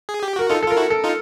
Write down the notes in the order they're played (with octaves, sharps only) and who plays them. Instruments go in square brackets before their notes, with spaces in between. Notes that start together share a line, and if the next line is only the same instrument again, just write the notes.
[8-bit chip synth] G#4
G4
[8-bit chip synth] F#4 [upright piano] A#4
[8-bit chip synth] D#4 F4 [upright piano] A4
[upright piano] A4
[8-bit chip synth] F4 [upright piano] A#4
[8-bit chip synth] E4 F#4
[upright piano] A4
[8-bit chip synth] D#4 F4